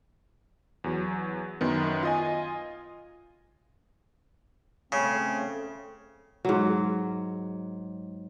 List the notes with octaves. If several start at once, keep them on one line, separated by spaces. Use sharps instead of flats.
E2 F#3
F#2 D#3 B3
F4 D#5 G#5
C#3 A3 C4 C#4
G#2 F#3